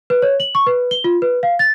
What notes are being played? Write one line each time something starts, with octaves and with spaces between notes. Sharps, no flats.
B4
C#5
F#7
C#6
B4
G7
F4
B4
F5
A6